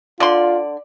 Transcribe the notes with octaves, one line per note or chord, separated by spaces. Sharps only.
D3 F4 D5 C6